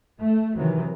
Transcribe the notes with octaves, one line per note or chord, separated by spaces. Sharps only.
A3
C3 D#3 E3 F#3